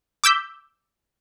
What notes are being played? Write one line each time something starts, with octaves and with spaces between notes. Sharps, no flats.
D6 E6 G6 B6